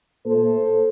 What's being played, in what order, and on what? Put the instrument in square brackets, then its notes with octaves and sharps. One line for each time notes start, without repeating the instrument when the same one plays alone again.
[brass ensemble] A#2 A3 A4 C5